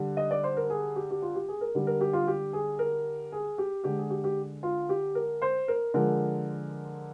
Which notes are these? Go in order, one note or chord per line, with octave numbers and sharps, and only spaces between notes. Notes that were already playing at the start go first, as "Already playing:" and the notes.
Already playing: D3 G3
D#5
D5
C5
A#4
G#4
G4
G4
F4
G4
G#4
A#4
D3 G3
A#4
G4
F4
G4
G#4
A#4
G#4
G4
D3 G#3 G4
G#4
G4
G4
F4
G4
A#4
C5
A#4
D3 F3 G#3 A#4